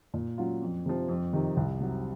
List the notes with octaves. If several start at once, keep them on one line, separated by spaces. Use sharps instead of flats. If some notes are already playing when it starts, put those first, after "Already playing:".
A#2
F#3 C#4 F4
F2
C3 F3
F2
C3 D#3
C2
C3 F#3